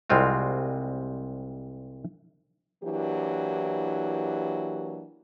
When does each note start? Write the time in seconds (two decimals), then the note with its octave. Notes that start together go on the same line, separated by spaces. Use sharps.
0.10 C2 G3 G#3 C4 F4 F#4
2.84 E3 F#3 A#3 D4 E4 G4